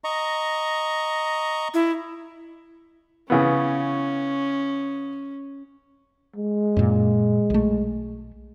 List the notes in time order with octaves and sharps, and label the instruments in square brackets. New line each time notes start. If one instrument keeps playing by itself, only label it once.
[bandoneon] D#5 A#5 C#6
[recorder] E4
[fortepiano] C#3 E3 B3 [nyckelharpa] C#4
[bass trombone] G#3
[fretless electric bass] F#2 A#2
B1 A3